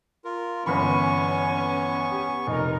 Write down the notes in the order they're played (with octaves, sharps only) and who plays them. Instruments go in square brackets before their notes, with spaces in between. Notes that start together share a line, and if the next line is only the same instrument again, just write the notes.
[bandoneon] F4 A#4
[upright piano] G1 E3 B5 [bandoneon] B3 C#6 [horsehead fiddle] C#4 G#5
[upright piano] G4
[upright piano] F1 [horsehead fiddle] D#4 A#4